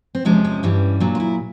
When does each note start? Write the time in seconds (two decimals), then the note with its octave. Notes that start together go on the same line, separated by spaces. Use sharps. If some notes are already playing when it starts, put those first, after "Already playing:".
0.15 C4
0.25 E2 C3 F3 G#3 C#4
0.45 C#4
0.63 G2 E3 G3 C#4
1.00 A#2 F#3 D4
1.15 F4
1.20 E4